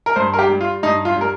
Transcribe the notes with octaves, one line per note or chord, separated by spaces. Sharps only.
A#4
G2 C5
A#4
G4
G3
F4
G2 D#4
F4
G3 A#4